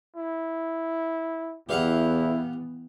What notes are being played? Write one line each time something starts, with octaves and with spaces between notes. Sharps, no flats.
E4
E2 E3 B3 E4 G4 F5 F#5